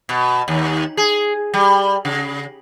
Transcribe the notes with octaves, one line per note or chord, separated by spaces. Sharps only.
B2
D#2
G#4
G3
C#3